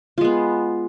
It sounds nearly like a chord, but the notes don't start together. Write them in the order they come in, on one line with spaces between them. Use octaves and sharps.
F4 G#3 B3